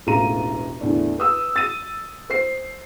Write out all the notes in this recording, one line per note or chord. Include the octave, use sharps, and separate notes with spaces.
E1 A1 A2 F4 A#5 D#7
E2 A2 D3 D4
B4 D#6 E6
A6 D#7
C5 C7